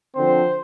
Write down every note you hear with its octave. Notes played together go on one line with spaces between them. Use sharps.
D3 F3 C4 C5